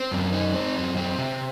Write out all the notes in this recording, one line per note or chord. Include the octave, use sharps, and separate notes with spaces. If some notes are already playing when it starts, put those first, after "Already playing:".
Already playing: C4
F#2
D#4
C4
F#2
C4
C3